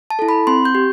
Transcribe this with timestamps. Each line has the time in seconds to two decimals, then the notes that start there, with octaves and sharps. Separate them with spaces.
0.10 A5
0.19 E4 A4
0.29 B5
0.47 C4 C6
0.65 G6
0.75 G4